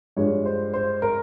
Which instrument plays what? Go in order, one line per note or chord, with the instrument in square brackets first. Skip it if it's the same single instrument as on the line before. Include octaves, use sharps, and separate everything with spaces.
[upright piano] G2 F3 G#3 C#5
C5
C5
A#4